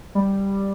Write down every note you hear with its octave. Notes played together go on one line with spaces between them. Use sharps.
G3